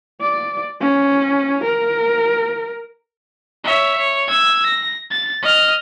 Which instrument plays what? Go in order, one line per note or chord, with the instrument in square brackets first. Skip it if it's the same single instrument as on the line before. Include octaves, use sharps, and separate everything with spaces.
[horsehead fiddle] D5
C#4
A#4
[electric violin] C#5 E5
C#5
E6 G#6
A#6
A6
D#5 F6